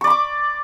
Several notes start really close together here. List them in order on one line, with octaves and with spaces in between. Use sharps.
C#6 D5 B5 D6